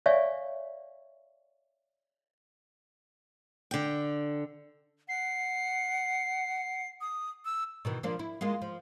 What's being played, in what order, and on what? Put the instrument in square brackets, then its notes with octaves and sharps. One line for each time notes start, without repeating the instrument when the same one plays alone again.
[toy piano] C#5 D5 E5 F5 G#5 C#6
[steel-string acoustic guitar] D3 G5
[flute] F#5 [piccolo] C7
[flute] D#6
E6
[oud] B2 D#3 E3
F3 A#3 D4
E4
G#3 A#3 F4
F3